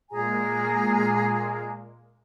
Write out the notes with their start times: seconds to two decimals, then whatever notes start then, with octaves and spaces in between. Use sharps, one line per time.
0.11 A#2 G#3 A#3 G#4 G#5 A#5